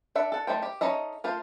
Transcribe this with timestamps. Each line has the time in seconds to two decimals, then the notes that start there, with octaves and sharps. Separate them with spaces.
0.15 D4 E5 F#5
0.32 A4 F#5
0.47 A3 D#4 C5 G5
0.62 G4
0.81 C#4 D#4 A4 D#5 E5
1.24 A3 F4 C5